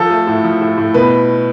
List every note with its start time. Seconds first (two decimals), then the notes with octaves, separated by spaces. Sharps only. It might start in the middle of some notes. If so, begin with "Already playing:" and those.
Already playing: F3 A4
0.10 A3
0.27 A2
0.44 F3
0.61 A2
0.78 A2
0.94 B2 B4